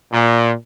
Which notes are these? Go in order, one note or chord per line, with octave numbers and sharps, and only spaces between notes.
A#2